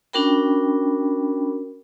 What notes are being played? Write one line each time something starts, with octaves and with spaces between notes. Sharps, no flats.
C#4 D4 F#4 A#4 G5 B5